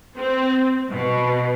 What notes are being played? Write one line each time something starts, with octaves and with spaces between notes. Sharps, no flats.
C4
B2